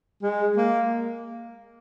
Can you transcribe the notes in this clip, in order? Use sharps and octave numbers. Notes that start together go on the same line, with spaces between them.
G#3
A#3